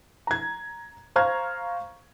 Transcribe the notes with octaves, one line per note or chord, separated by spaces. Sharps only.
A#5 G#6
C5 F5 A#5 C#6 F6 G#6